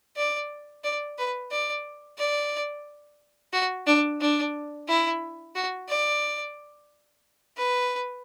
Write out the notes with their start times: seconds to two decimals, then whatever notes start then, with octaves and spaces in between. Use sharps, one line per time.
0.17 D5
0.84 D5
1.18 B4
1.51 D5
2.19 D5
3.53 F#4
3.87 D4
4.21 D4
4.88 E4
5.55 F#4
5.89 D5
7.57 B4